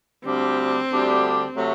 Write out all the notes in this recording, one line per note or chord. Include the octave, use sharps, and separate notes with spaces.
D2 D3 G3 C4 D4 G4
D2 D3 G3 D4 G4
C3 F#3 A3